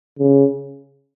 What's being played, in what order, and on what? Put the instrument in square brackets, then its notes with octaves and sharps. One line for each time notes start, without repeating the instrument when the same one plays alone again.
[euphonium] C#3